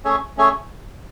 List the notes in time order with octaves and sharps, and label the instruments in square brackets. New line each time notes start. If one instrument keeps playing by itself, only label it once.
[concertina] A3 C#4 G#4 C#5 E5
A3 C#4 G#4 C#5 E5